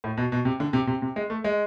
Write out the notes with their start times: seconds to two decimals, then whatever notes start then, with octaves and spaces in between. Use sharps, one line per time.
0.04 A2
0.17 B2
0.32 B2
0.45 C3
0.60 D3
0.73 C3
0.87 C3
1.02 C3
1.16 G#3
1.30 A3
1.44 G#3